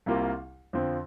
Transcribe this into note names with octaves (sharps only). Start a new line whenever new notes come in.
C2 C3 G3 A#3 F4
F2 D3 F3 C4